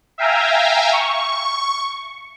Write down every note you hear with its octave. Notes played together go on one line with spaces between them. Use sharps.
E5 F5 G5 G#5 A#5
C#6